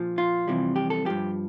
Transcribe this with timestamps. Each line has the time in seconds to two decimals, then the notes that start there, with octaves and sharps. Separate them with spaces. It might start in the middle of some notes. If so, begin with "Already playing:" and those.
Already playing: A#2 F3
0.18 F4
0.48 F2 C3 E3 G3
0.76 G4
0.90 A4
1.05 G2 F3 G4